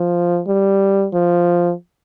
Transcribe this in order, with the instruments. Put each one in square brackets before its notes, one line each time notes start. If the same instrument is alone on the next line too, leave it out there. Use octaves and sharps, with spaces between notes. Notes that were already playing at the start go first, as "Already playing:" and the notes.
Already playing: [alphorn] F3
G3
F3